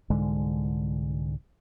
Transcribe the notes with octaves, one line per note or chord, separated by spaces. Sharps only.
C2 G#2 D3 G#3